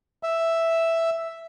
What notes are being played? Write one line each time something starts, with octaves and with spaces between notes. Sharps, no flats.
E5